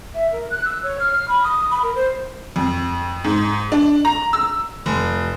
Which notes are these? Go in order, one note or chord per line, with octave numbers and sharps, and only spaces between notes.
E5
A#4
F#6
E6
C#5
F6
F6
B5
D#6
B5
A#4
C5
F2
G#2
D4
A#5
E6
F1